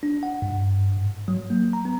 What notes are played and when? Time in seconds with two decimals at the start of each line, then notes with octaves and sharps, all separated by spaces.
0.03 D4
0.23 F#5
0.42 G2
0.97 G#2
1.28 F#3
1.50 A#3
1.73 A#5
1.85 B3